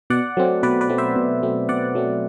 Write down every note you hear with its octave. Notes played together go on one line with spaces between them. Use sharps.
B2 D5 F#5
F#3 A3 C4
B2 B4 D5
B4 D5
F#3 A3 C4
C5 E5
B2
F#3 A3 C4
B2 D5 F#5
F#3 A3 C4